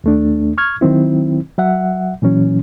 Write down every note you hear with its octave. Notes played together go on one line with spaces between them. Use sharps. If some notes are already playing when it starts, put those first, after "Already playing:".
D#2 A3 D4
C#6 F6 G#6
D#3 F#3 C4 E4
F#3 E5 F#5
A#2 E3 F#3 C#4